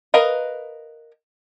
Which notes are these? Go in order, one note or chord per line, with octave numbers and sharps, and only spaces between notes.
A#4 B4 D#5 F5